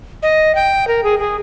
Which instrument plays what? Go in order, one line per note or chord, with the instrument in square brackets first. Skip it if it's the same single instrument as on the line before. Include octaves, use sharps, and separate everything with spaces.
[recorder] D#5
G5
A#4
G#4
G#4